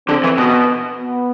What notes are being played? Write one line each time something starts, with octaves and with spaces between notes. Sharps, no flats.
D3 C4
E3
B2
B3